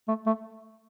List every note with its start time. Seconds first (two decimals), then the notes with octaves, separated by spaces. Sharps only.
0.08 A3
0.27 A3